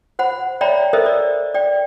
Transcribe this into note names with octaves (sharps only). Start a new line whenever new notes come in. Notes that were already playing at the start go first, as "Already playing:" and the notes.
C5 F#5 B5
C#5 D5 E5 G5 A#5 B5
A4 A#4 C5 D#5 E5
D5
D5 G5